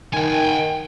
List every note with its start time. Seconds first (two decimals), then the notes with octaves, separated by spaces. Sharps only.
0.14 D#3 G5 G#5